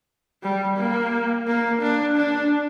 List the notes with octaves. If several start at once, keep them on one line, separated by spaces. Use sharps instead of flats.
G3
A#3
A#3
D4
D4